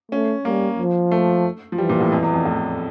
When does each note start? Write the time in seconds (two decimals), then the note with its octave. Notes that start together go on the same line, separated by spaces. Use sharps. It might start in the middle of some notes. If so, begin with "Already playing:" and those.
0.12 A3 C#4
0.45 G3 A#3
0.79 F3
1.11 A3
1.72 F3
1.78 E3 G3
1.89 A#2
2.01 A2
2.12 F2
2.23 E2
2.34 F2
2.45 A2